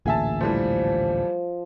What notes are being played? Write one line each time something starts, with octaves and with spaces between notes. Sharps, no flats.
A1 D2 A#2 G#4 E5 A5
E3 F3 G3 A3